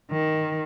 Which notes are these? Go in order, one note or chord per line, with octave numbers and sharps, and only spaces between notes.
D#3